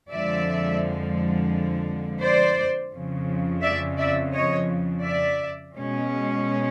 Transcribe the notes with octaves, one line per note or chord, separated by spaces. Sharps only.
F2 D3 F3 G#3 D5 E5
C5 D5
F2 C#3 F3
D5 E5
D5 E5
C#5 D#5
D5 E5
B2 G#3 C#4